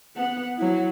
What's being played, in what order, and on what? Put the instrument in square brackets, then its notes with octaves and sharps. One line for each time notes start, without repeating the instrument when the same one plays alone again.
[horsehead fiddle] B3 F#5
F#3 E4